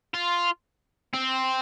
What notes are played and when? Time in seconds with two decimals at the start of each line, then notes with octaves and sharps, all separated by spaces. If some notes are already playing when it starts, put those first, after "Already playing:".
0.14 F4
1.14 C4